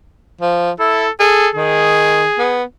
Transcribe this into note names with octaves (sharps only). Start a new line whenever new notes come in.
F3
E4 A4
G#4 A4
D#3 G#4
B3